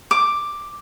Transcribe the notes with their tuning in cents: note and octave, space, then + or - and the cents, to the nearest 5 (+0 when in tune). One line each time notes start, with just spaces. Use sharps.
D6 +5